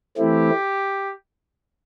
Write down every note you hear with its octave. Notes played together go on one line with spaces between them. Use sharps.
E3 A3 C4 E4 G4